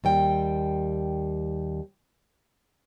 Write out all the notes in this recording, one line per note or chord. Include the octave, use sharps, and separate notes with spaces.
D#2 G3 G5